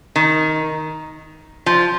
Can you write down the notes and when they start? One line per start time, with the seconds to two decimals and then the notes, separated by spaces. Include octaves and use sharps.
0.16 D#3
1.66 F3